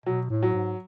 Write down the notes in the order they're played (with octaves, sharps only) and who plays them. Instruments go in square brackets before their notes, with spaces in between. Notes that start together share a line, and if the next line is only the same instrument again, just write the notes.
[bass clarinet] B2 [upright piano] F#3
[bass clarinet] A2
[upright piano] F#3
[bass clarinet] G#2